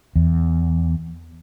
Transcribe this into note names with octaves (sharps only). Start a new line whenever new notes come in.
E2